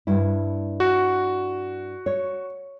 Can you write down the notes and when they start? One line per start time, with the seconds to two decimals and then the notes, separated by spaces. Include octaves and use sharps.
0.07 G2 E4
0.80 F#4
2.06 C#5